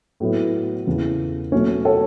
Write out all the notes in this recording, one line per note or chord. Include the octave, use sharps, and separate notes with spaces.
A2 F#3 B3 E4
E2 C#3 E3
B2 F#3 A3 C#4
A4 C#5